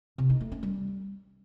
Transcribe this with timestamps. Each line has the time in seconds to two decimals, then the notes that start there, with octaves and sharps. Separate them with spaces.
0.18 C3
0.29 D#4
0.41 A3
0.52 C#4
0.63 G3